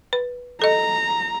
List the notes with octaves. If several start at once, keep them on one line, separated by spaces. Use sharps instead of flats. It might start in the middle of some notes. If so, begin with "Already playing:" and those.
B4
A4 D#5 A#5